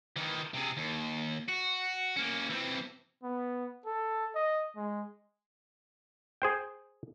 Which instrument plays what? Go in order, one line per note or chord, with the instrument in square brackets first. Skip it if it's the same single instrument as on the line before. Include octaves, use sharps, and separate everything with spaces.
[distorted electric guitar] D#3 E3
C3 G#4
D#2
F#4
A#3 C#4
E3 C4
[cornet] B3
A4
D#5
G#3
[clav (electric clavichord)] G#4 C5 G5